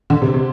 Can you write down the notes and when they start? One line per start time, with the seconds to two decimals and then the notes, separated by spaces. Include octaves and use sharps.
0.10 D3
0.22 C3
0.34 C3